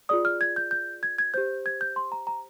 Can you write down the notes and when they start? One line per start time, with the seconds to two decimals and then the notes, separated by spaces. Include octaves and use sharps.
0.09 F4 G#4 D5 D#6
0.25 F6
0.41 G#6
0.56 G6
0.71 G6
1.03 G#6
1.19 G#6
1.34 G4 C5 G6
1.66 G#6
1.81 G6
1.96 C6
2.12 A#5
2.27 A#5